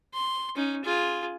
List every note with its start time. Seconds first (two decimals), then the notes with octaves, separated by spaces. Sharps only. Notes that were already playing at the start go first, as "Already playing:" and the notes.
0.13 C6
0.56 C#4 D#4
0.84 F4 G#4